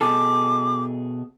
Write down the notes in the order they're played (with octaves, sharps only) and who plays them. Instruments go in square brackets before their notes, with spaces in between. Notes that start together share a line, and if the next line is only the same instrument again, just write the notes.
[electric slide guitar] B2 G#4 A4 [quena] D6